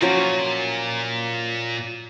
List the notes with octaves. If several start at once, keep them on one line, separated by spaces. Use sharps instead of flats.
A#2 F3 F#3 C#4